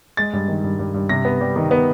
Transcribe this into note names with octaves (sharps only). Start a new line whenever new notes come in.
G#3 A6
G2
D#3
G2
G2
G2
C3 A#6
B3
G3
D#3
B3